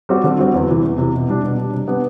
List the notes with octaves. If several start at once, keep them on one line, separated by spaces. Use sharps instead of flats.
G3 C4 F#4
D3
G3 C4 F#4
E2
C3 E3
E2
C3 E3
B2
G3 D4
B2
G3 D4
C3
G3 B3 D4